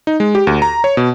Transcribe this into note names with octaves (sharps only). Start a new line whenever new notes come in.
D#4
G#3
G4
D2
A#5
C#5
B2